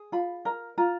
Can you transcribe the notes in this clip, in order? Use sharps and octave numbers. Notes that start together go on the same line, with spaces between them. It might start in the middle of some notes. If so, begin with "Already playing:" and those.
Already playing: G#4
F4 B5
A#4 A#5
F4 A#5